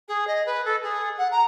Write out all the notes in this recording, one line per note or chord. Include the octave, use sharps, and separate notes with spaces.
G#4
D#5
B4
A4
G#4
F#5
A#5